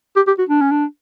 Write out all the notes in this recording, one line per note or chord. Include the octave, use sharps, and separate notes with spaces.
G4
G4
F#4
D4
C#4
D4